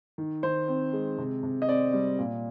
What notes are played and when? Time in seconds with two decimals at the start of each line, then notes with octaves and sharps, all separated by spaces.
0.18 D#3
0.43 D#3 C5
0.68 C4
0.93 G#3
1.18 C3
1.43 C3
1.62 D#5
1.68 C4 D5
1.93 G3
2.19 A#2